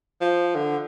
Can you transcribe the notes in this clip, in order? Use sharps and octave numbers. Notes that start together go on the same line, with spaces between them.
F3
D3